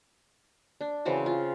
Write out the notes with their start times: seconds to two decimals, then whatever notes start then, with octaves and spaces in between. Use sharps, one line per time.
0.81 D4
1.05 C#3 E3 C4 F#4
1.26 F4